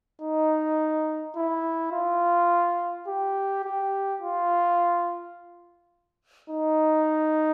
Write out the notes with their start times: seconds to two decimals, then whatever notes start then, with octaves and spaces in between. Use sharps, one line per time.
0.22 D#4
1.36 E4
1.92 F4
3.08 G4
3.64 G4
4.22 F4
6.50 D#4